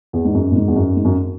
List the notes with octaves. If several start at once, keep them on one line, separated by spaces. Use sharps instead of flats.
E2
G#2
F#2
A#2
G#2
E2
F#2
G#2
F#2